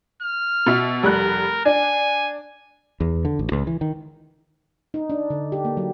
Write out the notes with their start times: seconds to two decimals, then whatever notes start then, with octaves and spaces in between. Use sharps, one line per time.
0.22 F6
0.66 B2 E5
1.03 F1 G3 A#4 F#6
1.65 D4 G#5
3.00 E2
3.25 D3
3.39 A1
3.52 C#2
3.67 E3
3.81 D#3
4.94 D#4
5.10 D4
5.30 D3
5.52 G4
5.65 A#3
5.77 F#3